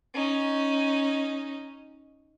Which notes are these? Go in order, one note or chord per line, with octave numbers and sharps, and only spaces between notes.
C#4 D#4